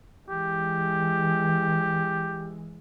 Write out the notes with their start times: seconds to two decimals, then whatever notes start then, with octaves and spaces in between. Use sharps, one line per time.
0.28 E3 G#3 G4